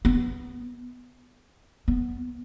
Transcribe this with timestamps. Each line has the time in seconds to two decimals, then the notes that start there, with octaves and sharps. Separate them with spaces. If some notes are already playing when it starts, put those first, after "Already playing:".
0.05 B3
1.88 B3